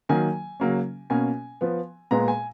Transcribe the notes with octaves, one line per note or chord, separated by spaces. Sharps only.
D#3 F#3 A#3 G#5
C#3 F#3 A#3 C#4
B2 A#3 C#4 G#5
F3 B3
A#2 G#3 B3 A#5
G#5